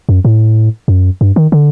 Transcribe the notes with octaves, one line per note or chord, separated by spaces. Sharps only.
F#2
A2
F#2
G2
D#3
D3